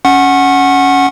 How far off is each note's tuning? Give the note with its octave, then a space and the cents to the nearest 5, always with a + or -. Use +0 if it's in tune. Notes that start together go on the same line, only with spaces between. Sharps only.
C#4 +5 F#5 +0 C#6 -35